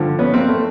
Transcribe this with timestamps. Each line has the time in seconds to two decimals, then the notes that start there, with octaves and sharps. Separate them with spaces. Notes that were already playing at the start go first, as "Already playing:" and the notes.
Already playing: G2 D3 F3
0.19 B3 C#4
0.34 A#3 C4
0.49 A3